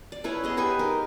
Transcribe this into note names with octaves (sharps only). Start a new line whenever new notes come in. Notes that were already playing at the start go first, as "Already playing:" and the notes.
D5
C#4 E4 B4 C#5
B3 G#4 D#5
G4 G#4 B4 G#5
D#4 A#4